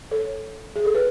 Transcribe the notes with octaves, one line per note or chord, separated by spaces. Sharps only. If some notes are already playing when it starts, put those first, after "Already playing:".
A4 C#5
G#4
A4
B4